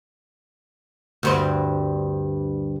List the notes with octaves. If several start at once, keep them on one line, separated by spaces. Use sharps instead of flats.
D2 G2 C4